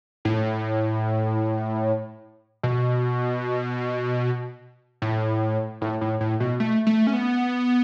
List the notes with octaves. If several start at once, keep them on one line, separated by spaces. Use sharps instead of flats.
A2
B2
A2
A2
A2
A2
B2
A3
A3
C#4
B3